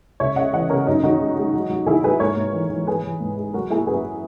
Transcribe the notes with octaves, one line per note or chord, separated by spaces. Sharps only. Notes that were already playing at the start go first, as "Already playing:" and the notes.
C#2 C#5 E5
C#3 D#5 F#5
E3 D#5 F#5
C#3 A#4 C#5
F#2 D#4
D#3 D#4 F#4
G#3
G#3
F#3
F#3
D#3 E4 G#4
F#3 G#4 B4
G#2 A#4 C#5
G#2
E3
E3
E3 G#4 B4
E3
G#2
G#3
F#3 F#4 A#4
A#3 E4 G#4
F#2 G#4 B4